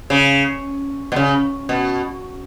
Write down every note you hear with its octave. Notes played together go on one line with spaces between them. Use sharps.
C#3
B2
C#3
B2